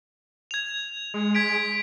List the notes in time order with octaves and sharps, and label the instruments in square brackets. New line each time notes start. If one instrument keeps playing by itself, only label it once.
[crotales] G#6 F7
[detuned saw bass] G#3
[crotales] G#6 B6 D7